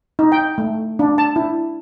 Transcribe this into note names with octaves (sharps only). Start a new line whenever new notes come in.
D#4
G5
A3
D4
A5
E4